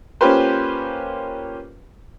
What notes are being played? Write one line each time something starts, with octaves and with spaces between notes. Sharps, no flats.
A#3 C#4 F4 G4 B4 C5